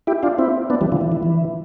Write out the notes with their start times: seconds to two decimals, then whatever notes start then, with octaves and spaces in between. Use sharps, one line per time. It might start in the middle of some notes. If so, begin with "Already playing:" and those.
0.07 E4 G4
0.23 D4 F4
0.38 C4 E4
0.70 B3 D4
0.81 E3 G3
0.92 D3 F3
1.01 E3
1.12 E3
1.23 E3